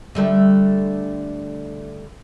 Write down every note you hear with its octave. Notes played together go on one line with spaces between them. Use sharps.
D3 G3 A3